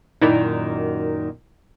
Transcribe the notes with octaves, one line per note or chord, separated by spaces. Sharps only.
F#2 A#2 D#3 D#4 E4 D5